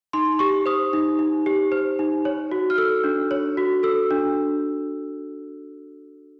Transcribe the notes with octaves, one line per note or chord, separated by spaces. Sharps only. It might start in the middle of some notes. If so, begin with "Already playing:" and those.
D#4 C6
G4 C#6
C5 D#6
D#4
D#4
G4
C5
D#4
C#5
F#4
F6
A4 E6
D4
C#5
F#4
A4 E6
D4